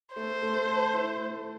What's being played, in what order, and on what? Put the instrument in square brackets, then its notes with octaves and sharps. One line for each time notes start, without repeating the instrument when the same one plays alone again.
[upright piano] A3 [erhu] C5
[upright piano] A3
A4
E4
A3